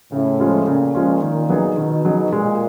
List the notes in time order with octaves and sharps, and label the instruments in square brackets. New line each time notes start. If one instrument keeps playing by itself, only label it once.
[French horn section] A2 [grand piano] C#3
[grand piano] F3 G#3 C#4 F4
[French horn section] A#2 [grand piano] C#3
[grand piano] F3 G#3 C#4 F4
D#3
F#3 B3 D#4 G#4
[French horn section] B2 [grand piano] D#3
[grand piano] F#3 B3 D#4 G#4
[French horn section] A#2 [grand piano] G#3